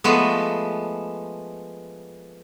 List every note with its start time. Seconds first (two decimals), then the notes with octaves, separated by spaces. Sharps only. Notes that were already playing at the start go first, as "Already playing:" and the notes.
0.04 F3 G#3 A3 B3